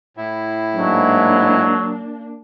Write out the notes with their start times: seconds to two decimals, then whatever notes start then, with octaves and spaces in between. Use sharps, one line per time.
0.17 A2 E4
0.75 G#2 F#3 A#3 D4